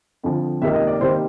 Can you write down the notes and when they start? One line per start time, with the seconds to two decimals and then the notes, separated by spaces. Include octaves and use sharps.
0.23 F2 D3 F3
0.62 C#2 C3 D#3 G3 A#3 E5
0.75 D#5
0.87 D5
1.00 C3 D#3 G3 A#3 C5